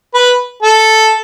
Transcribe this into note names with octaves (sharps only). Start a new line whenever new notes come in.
B4
A4